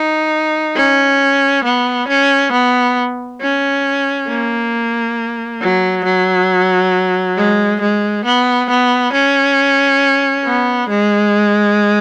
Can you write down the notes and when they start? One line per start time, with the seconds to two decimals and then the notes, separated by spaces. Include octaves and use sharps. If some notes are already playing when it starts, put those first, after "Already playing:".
Already playing: D#4
0.76 C#4
1.65 B3
2.09 C#4
2.52 B3
3.41 C#4
4.28 A#3
5.62 F#3
6.05 F#3
7.37 G#3
7.81 G#3
8.25 B3
8.70 B3
9.13 C#4
10.45 B3
10.89 G#3